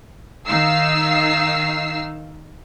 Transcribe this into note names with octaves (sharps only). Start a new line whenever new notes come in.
D#3 D#4 F5 E6 C7